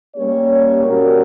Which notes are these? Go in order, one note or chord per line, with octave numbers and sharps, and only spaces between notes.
G3 A#3 C#4 G4 C#5
A#2 G3 C#4 F#4 A#4